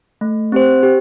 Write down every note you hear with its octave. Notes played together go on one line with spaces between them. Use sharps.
A3
C4 G4 C5
G4